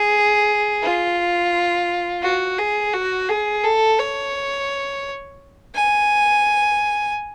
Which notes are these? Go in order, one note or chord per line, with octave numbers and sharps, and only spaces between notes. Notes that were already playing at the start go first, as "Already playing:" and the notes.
Already playing: G#4
F4
F#4
G#4
F#4
G#4
A4
C#5
G#5